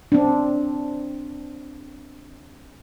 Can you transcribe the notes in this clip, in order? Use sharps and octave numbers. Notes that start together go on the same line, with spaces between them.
C4 D4